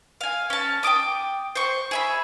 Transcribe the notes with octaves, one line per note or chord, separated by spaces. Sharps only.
F5 G#5
C#4 A5
G5 A5 D6 D#6
C5 C#6
G#4 E5 B5